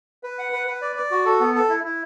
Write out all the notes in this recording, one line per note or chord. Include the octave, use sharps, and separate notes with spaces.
B4
F#5
B4
B4
D5
D5
F#4
A4
B3
A4
E4
E4